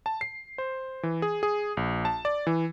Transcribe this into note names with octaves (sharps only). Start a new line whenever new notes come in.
A5
C7
C5
E3
G#4
G#4
A#1
A5
D5
E3